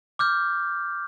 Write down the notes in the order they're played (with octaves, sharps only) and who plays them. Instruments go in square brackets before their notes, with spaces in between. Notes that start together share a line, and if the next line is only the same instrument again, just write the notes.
[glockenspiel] D6 F6 G6